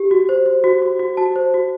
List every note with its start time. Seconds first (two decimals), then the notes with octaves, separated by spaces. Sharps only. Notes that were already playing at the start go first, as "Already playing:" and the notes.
Already playing: G4
0.11 F#4
0.29 C5
0.46 C5
0.64 F#4
0.82 F#4
0.99 F#4
1.17 F#4 A5
1.36 C5
1.54 F#4